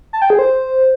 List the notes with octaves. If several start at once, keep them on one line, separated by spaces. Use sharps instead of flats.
A5
G5
G#4
C5